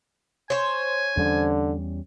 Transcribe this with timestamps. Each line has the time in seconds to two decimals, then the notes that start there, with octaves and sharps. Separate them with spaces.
0.50 C5 C#5 G#5
1.17 E2 D3 G3 C#4